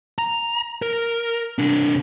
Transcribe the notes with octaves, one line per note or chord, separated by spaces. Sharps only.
A#5
A#4
C3 D4